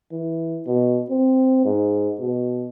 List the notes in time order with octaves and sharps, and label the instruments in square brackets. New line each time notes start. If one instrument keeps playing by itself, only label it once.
[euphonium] E3
B2
C4
G#2
B2